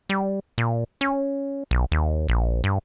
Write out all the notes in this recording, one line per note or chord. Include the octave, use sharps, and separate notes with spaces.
G3
A#2
C#4
B1
D#2
A#1
G2